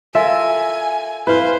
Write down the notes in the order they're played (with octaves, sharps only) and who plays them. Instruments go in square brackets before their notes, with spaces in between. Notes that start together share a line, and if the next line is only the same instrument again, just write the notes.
[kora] F4 A4 A#4 [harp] E5 [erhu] G#5
[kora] E4 F5 [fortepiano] B4 [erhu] C5